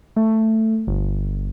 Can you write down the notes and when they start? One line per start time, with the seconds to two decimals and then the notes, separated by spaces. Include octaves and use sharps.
0.16 A3
0.87 G1